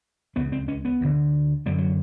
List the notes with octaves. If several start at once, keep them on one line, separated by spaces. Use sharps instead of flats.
C#2 C#3 B3
C4
C#4
B3
D2 D3
F#2 D3 G3
F#3